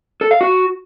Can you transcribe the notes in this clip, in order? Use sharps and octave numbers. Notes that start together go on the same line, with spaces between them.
A4
F5
F#4